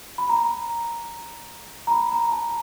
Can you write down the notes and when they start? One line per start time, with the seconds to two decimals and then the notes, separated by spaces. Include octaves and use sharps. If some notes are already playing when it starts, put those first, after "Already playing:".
0.18 B5
0.29 A#5
1.87 A#5
1.91 B5
2.12 A#5
2.32 A5